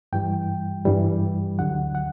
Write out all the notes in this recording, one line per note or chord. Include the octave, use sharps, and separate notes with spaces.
G2 E3 G3 G5
G2 E3 G3
D2 D3 F#3 F#5
F#5